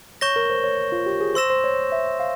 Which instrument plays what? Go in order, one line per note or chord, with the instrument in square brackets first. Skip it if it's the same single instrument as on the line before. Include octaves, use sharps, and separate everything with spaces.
[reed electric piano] C#5 [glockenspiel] C#6 G6 A#6 E7 G7
[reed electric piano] A#4
C5
C#5
F4
G4
G#4
[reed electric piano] C5 [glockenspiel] C6 E6 A#6 E7
[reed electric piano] C5
C#5
E5
F5